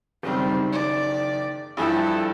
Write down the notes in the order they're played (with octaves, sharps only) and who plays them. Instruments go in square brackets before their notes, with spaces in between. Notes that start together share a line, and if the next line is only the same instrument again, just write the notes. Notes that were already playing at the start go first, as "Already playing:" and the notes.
[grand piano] F#1 D#3 [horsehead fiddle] G3 C4
[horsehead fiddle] D5
[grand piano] G2 F3 G4 [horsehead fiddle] E4 A4